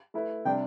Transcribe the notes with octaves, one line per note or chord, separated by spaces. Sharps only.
A3 E4 B4
C3 G3 D4 G5